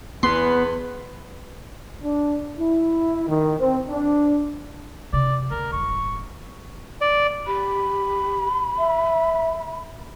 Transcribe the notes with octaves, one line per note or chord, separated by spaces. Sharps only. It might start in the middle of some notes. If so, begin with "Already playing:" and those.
E2 B3 B4 C6
D4
E4
D#3
C4
D4
C3 D4 D5
D2 A#4
D#1 G#1 C#6
D5
G4 B5
E5